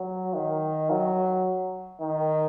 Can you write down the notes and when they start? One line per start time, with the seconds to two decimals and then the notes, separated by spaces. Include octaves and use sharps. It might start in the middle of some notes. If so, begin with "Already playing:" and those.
Already playing: F#3
0.34 D#3
0.90 F#3
2.01 D#3